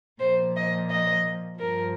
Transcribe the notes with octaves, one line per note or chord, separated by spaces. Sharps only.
A#2 F3 C5
D#5
D#5
G2 F3 A#4